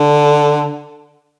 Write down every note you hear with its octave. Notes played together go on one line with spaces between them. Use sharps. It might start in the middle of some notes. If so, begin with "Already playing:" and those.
Already playing: D3